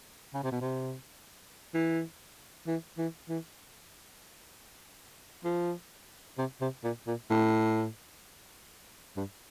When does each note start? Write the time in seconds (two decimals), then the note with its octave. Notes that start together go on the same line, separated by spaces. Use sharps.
0.34 C#3
0.43 C3
0.52 B2
0.61 C3
1.74 E3
2.67 E3
2.98 E3
3.29 E3
5.44 F3
6.38 C3
6.61 C3
6.84 A#2
7.07 A#2
7.30 A2
9.16 G2